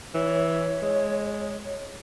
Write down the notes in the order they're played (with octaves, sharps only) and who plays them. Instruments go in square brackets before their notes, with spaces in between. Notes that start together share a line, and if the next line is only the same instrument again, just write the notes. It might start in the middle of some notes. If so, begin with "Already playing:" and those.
[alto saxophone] E3 [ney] C#5
[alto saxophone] G#3